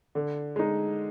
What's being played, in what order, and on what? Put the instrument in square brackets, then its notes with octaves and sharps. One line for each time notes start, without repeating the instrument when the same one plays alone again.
[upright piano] D3
G#3 D#4